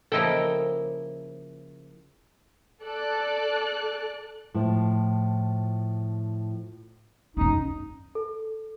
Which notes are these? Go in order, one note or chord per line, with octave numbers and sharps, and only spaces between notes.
C#3 F3 A#3 E4 A4 D#5 G5
A4 D5 F#6
A2 F3
F#2 C#4 D#4
A4